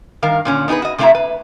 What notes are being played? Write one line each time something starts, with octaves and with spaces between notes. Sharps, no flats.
G2 D#3 A#4 F5
A#2 D3 C#4
B3 D#4 G4 G#4 B4
F#4 D#5
C3 A3 C4 E4 E5 A#5
B4